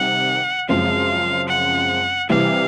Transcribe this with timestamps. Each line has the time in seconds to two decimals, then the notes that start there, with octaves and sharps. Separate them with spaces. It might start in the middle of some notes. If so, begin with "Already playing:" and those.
Already playing: C3 D#3 G3 F#5
0.69 F#2 C#3 F3 G#3 C4 F5
1.49 F#5
2.29 C3 E3 G3 F5